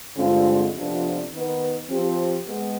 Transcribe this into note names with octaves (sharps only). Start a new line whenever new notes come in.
G2 D3 G#3 C4 F4
F2 C3 F3 B3 D4
D#3 B3 D#4 B4
F3 C4 G4
G#3 B3